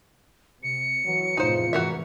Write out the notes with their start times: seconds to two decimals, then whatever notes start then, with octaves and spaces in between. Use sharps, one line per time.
0.63 C3 C#7
1.05 E3 F#3
1.37 F1 E2 A2 D#4 F4 C5
1.73 G#2 E3 F#4 A#4 E5